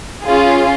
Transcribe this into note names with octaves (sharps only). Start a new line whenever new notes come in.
C#4 F4 G#4